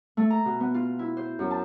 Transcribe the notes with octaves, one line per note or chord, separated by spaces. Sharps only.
A3
A#5
B2
B3
F4
E4
C5
F#2
A5